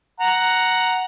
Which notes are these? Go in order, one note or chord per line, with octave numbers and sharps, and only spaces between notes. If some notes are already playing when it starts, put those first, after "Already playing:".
F#5 A#5